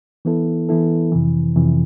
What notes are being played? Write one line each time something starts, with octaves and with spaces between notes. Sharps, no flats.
E3 B3 E4 A4
E3 B3 E4 A4
F2 C3 E3
F2 C3 E3